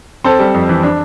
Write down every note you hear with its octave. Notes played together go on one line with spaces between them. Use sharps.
C4 A4 C5
G3
F2
E3
D4